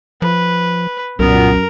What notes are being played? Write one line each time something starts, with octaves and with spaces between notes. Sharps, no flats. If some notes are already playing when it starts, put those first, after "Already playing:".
F3 B4
C2 F#2 A#2 B3 A#4